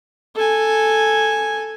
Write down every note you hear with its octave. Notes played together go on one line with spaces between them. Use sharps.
A4 G#5